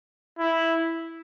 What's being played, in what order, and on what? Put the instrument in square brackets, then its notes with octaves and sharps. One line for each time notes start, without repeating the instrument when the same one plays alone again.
[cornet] E4